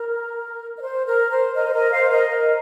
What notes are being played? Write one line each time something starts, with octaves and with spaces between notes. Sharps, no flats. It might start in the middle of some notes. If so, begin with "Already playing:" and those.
Already playing: A#4
D#5
C5
A#4
C5
A#4 D#5
C5
A#4 D#5
C5 F5
A#4 D#5
A#4